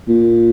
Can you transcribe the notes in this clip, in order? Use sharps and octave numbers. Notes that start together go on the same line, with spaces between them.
A#2